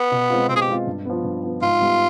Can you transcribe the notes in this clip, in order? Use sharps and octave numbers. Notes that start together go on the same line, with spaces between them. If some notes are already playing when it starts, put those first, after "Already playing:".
Already playing: B3
B2
G#3 C4 F4
B2 C4
G#4
G4
G#3 C4 F4
G2
F3 B3
G2
F3 B3
G#2 F4
G3 B3